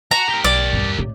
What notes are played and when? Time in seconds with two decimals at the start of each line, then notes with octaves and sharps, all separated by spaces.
0.11 F#4 A#5
0.29 G4 A#4
0.44 B1 D5
0.73 E2 G2
0.99 A2